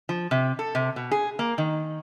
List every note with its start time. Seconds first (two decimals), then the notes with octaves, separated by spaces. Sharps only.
0.09 F3
0.31 C3
0.59 A4
0.75 C3
0.96 B2
1.11 G#4
1.39 A#3
1.58 D#3